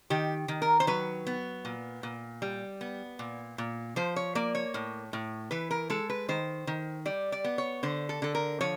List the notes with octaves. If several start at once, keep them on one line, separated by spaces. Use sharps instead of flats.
D#3 G4
D#3
A#4
C5
F#3 B4
B3
A#2
A#2
G3
B3
A#2
A#2
F3 C5
C#5
A#3 D5
C#5
A2
A2
E3 B4
A#4
G#3 A4
B4
D#3 C5
D#3
G3 D5
D5
B3
C#5
D3 C5
A4
D3 A4
A#4
F3 C#5